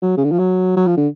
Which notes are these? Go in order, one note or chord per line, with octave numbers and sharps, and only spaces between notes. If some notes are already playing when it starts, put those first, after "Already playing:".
F#3
C#3
D3
F3
F#3
F#3
F3
D3